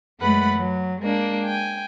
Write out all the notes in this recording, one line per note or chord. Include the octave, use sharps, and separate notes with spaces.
F#2 G#3 A3 B4 F#5 B5
F#3
G#3 A#3 D4
G5 G#5